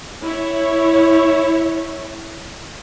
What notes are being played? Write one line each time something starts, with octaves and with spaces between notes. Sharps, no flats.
E4 C#5